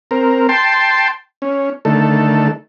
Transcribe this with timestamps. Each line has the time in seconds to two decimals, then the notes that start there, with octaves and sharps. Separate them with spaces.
0.11 C4 A#4
0.49 G5 A5 C6
1.42 C#4
1.85 D3 D#3 A3 A4